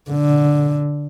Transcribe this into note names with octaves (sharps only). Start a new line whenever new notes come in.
D3